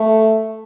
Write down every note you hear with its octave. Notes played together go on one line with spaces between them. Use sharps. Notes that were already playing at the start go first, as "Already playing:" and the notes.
Already playing: A3